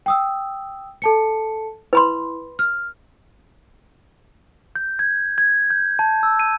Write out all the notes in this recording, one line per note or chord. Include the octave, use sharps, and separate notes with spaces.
G5 D#6 E6
A4 A5 C#7
E4 B4 B5 C6
F6
G6
G#6
G#6
G6
A5
E6
D#7